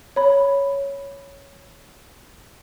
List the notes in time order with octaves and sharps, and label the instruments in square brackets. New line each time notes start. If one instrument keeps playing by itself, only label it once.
[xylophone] C#5 B5